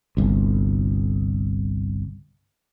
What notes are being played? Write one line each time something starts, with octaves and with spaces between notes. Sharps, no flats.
G1 C2